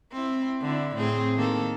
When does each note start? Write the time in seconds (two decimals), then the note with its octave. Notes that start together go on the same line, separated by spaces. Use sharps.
0.12 C4 E4
0.62 D3 E4
0.96 A2 C4 G#4
1.35 D#3 A#3 A4